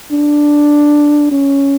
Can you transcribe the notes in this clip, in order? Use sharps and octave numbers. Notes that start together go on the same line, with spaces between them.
D4
C#4